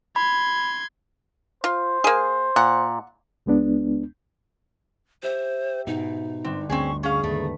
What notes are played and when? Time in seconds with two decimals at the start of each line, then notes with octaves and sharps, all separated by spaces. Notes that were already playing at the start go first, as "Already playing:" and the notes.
0.16 B5 C6 G#6
1.64 F4 C5
2.04 A#3 G#4
2.56 A#2 F#5
3.46 C#2 G#3 B3 D4
5.23 G4 C5 E5
5.87 G#2 B2 D#4
6.44 G1 D3 C4
6.70 D2 C4 C#4 G#4 C#6
7.03 C#4 G#4 F5
7.24 D#2 G#2 C#3 A3 A4 B4